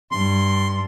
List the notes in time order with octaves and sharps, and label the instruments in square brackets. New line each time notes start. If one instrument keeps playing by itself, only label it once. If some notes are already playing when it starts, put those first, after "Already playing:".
[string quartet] G2 [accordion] C6